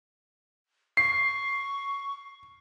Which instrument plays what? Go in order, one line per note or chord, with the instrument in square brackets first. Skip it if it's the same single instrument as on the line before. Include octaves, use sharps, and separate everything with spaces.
[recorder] C#6 [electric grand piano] C7